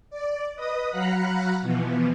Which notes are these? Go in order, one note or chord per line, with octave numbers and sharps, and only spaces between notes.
D5
B4 D#5 D#6
F#3 F5 F#5 A#5 B5 F#6
B2 E3 F3 B3